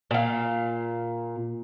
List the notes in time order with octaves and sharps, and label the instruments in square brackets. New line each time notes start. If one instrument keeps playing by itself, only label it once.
[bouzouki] A#2 F5